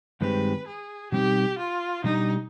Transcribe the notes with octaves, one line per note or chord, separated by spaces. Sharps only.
G2 D#3 G#3 C4 G4 B4
G#4
B2 G3 C4 D#4 G4
F4
B2 G3 D4 D#4 G4